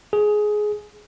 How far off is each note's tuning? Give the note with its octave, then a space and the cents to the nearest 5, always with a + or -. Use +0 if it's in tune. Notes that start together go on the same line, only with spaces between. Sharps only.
G#4 +15